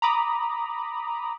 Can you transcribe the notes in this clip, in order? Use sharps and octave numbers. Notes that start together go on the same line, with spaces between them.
A#5 B5 D6 D#6